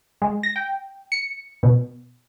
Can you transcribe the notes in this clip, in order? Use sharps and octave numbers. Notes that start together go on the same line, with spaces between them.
G#3
A#6
G5
C#7
B2